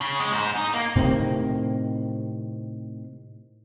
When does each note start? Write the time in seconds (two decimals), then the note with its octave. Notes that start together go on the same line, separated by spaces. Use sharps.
0.01 C#3
0.20 G#3
0.33 G#2
0.56 D#4
0.74 A#3
0.96 A2 C3 D#3 C4